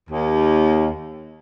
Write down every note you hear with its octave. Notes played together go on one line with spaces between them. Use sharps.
D#2